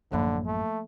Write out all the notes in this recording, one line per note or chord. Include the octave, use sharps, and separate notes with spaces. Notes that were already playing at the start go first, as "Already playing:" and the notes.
A1 F#2 D3 F3 A#3 B5
A3